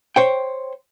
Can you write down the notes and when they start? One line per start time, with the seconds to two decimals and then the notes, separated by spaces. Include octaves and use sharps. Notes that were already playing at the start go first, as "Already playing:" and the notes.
0.16 C5 C#5 G5